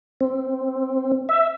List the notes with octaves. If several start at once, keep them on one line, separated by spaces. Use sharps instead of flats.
C4
E5